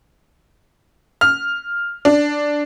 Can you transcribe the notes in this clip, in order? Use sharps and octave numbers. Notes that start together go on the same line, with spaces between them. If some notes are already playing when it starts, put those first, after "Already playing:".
F6
D4